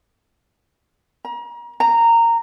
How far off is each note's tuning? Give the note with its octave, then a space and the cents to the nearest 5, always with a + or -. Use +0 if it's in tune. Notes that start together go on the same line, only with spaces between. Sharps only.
A#5 +35
A#5 -15